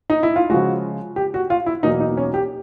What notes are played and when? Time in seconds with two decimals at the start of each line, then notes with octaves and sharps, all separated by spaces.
0.10 D#4
0.23 E4
0.36 F4
0.50 C#3 F3 G#3 F#4
1.16 G4
1.34 F#4
1.50 F4
1.66 E4
1.83 E2 B2 F#3 A#3 D#4
2.00 D#4
2.17 C#4
2.34 G4